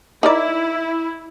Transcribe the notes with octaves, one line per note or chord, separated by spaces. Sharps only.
D#4 E4 A#4 D5